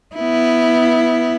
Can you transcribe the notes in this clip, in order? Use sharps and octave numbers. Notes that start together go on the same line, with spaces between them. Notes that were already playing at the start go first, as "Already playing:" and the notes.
B3 E4